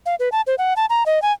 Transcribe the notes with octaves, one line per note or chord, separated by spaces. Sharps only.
F5
B4
A5
C5
F#5
A5
A#5
D#5
G#5